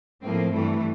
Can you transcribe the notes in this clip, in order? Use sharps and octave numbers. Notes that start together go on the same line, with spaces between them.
A2 F3 A#3 C4
G2 E3 A3